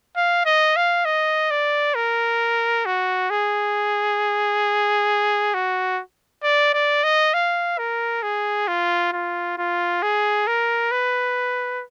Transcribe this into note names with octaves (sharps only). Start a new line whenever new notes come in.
F5
D#5
F5
D#5
D5
A#4
F#4
G#4
F#4
D5
D5
D#5
F5
A#4
G#4
F4
F4
F4
G#4
A#4
B4